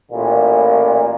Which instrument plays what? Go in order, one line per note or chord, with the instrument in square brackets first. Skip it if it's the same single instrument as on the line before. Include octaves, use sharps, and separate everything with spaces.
[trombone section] A1 A#2